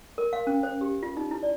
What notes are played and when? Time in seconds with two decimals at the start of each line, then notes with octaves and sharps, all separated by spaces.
0.18 A#4
0.33 F5
0.47 C#4
0.63 C5
0.81 G4
1.03 F4
1.17 D#4
1.31 E4
1.43 D5